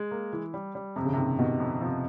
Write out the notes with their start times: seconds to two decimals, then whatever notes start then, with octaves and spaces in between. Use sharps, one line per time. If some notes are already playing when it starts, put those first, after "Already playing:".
Already playing: G#3
0.11 A#3
0.33 E3
0.54 G3
0.75 G3
0.96 F2 C3
1.05 C#3
1.13 C3
1.17 D#3
1.39 B2 D#3
1.60 F2
1.81 C3 F3